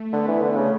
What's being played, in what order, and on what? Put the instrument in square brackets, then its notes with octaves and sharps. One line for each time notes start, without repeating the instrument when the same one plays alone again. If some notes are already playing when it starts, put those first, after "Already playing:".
Already playing: [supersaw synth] A3
[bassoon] D3 [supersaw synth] B3
[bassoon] E3
D3
C#3